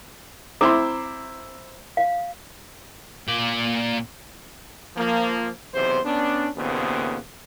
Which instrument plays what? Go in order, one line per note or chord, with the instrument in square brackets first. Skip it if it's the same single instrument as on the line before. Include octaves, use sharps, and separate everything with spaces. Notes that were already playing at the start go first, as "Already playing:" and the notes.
[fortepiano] C4 E4 C6 [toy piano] A#5 D6
[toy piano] F5
[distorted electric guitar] A#2 D5
[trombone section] F3 A#3
B1 E2 C3 C5
B3 C#4 D4
D#2 A#2 C#3 B3 C4